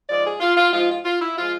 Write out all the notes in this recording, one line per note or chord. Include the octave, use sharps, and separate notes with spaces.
G#2 F3 G#3 D5
G#4
F4
F4
G#2 F3 G#3 F4
F4
F4
E4
F3 G#3 F4